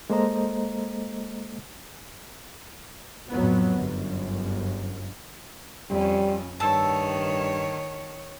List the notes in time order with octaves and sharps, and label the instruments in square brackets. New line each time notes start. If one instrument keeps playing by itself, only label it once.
[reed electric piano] G#3 A#3 A4 C5 D#5 A#5
[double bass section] F2 A2 F#3 B3
G1 F#2
[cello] F2 C#4 [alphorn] G3
[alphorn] G2 [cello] D#3 C#5 [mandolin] A5 E6